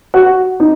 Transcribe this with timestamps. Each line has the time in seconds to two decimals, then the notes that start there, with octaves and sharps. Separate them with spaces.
0.14 F#4
0.60 D#4